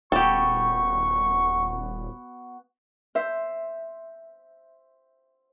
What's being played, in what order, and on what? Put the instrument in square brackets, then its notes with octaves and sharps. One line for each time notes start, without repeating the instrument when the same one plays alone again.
[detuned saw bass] D#1 [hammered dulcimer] B3 F#4 [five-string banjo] G4 A4 [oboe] C#6
[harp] C5 E5